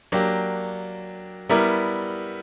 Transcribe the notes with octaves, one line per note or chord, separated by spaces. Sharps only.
F#3 A#3 D4 G4
G3 B3 E4 A#4 D5